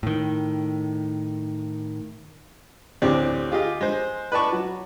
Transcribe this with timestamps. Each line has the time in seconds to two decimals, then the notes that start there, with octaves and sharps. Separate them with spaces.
0.03 A2 D#3
3.02 D2 A2 C4 D4 G4
3.52 F4 G4 G#4 D#5
3.81 G#3 C5
4.32 B4 D5 D#5 A5 C#6
4.52 F#3